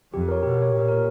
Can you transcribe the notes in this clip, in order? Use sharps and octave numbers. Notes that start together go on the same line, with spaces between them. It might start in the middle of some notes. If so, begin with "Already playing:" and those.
F2 G4
A#4 C#5
B2 G4
A#4 C#5
A#2 G4
A#4 C#5